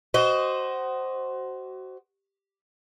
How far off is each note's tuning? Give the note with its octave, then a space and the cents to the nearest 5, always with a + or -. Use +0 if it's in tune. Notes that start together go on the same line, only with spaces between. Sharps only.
F#4 +25 C5 +0 D#5 +0